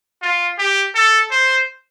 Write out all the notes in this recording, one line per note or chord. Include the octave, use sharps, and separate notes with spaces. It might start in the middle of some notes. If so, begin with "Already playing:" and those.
F4
G4
A4
C5